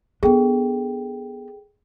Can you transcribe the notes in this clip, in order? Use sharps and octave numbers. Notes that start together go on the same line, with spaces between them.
B3 D4 G#4 A4 G5